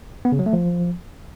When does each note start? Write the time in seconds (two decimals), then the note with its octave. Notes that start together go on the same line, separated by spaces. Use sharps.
0.25 B3
0.32 C#3
0.39 F#3
0.46 A3
0.53 F3